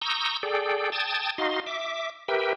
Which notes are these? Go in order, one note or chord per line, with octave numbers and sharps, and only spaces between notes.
A#5 C#6 D#6 E6 G6
G#4 A4 D5 G5
G5 A5 D#6 G#6 A6
D#4 F#4 D#5 F5 C6
E5 D6
G4 A#4 B4 E5 G5